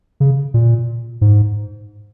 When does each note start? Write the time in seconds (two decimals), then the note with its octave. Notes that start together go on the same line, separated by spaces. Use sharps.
0.20 C#3
0.54 A#2
1.21 G#2